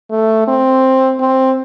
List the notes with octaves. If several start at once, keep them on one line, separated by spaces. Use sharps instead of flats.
A3
C4
C4